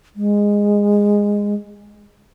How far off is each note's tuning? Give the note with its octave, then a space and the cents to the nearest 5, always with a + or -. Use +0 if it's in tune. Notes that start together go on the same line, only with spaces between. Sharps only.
G#3 -15